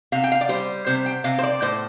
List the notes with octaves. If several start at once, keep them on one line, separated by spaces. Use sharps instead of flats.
C3 F5
G5
F5
D5
G3 C5
C3 C5
G5
C3 F5
C5
D5
A2 C5